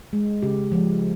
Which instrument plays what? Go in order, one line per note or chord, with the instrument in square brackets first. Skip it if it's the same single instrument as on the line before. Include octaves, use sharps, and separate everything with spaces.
[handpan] G#3
C#3 G4
F3 G#3